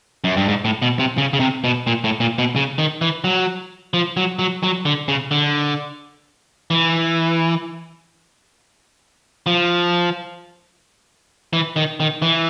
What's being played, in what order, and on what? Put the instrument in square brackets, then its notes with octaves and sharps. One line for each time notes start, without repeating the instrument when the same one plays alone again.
[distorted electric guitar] F#2
G2
G#2
A2
B2
C3
C#3
C#3
C3
B2
A#2
A2
A#2
B2
C#3
D#3
E3
F#3
F3
F#3
F#3
F#3
D3
C#3
D3
E3
F3
E3
D#3
D#3
E3